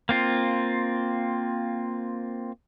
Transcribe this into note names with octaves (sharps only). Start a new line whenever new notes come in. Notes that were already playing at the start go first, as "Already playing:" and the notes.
A#3 C4 F4